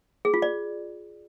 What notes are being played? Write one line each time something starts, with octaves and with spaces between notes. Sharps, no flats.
G#4
F4
D5